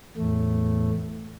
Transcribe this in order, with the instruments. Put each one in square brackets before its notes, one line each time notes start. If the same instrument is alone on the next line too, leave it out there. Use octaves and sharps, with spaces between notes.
[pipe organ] E2 A2 A3